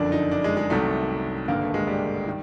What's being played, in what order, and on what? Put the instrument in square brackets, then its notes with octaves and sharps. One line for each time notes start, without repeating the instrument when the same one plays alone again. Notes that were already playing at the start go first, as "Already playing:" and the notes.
Already playing: [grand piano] F#1 F2 D3 D4
D#4
D4
G#3
G#3
C2 C3 D#3 F#3 A3
G#1 G2 D3 A#3
A3
G#3
G3
D#3